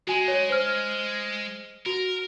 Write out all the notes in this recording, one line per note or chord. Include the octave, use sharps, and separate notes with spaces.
G#3 F#4 G#5
C#5
C5 F6
F#4 A#4